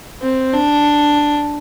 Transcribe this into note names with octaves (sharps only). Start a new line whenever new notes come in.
C4
D4